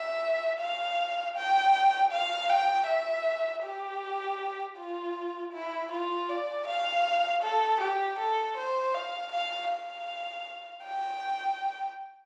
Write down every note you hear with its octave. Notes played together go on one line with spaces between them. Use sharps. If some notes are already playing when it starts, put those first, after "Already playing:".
Already playing: E5
F5
G5
F5
G5
E5
G4
F4
E4
F4
D5
F5
A4
G4
A4
C5
F5
F5
F5
G5